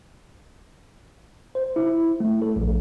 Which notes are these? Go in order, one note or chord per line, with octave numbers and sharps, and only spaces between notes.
C5
E4
A3
A4
A#1